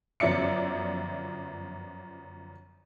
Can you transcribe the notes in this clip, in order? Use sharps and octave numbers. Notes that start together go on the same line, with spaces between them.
G1 F#2 F3 D5 E5 C#7